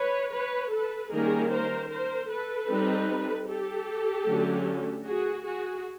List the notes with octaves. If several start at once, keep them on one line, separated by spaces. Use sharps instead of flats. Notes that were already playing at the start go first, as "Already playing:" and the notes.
Already playing: B4 C#5
B4 C#5
A4 B4
D#3 G3 A#3 C#4 G#4 A#4
A#4 C5
A#4 C5
A4 B4
G3 C4 D#4
G4 A4
D3 F#3 A3 C#4
F#4 G#4
F#4 G#4